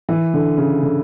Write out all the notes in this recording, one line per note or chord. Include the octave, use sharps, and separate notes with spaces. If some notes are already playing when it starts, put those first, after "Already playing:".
E3
D3
C#3
D3